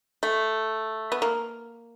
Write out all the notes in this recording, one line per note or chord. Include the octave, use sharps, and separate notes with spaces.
A3
B3
A#3